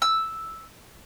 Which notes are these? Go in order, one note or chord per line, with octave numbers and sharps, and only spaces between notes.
E6